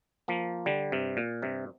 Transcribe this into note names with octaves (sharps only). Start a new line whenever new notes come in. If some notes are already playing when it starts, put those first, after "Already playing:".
F3 A#3
D3 G3
G2 C3
A#2
G2 C3